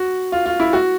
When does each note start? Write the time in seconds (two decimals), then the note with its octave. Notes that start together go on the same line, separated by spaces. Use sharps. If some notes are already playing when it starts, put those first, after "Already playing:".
Already playing: F#4
0.32 F4
0.46 F4
0.60 E4
0.73 F#4